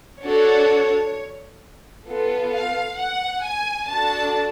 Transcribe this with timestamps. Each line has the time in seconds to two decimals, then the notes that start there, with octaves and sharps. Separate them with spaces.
0.23 D4 F#4 A4 C#5
2.07 B3 F4 A4
2.53 F5
2.98 F#5
3.44 G#5
3.89 D4 F#4 A4 A5